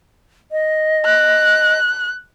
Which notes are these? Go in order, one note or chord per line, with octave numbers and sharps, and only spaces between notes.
D#5
F#6